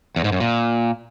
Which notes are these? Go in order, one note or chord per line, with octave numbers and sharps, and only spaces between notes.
E2
G#2
F#2
A#2